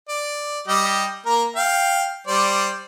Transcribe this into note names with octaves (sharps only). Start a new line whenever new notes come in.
D5
G3 G4 D#5
A#3 A#4
F5 G5
G3 C5 D5